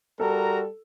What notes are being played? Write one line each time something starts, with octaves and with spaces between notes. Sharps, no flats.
G3 F#4 A4 A#4 A#5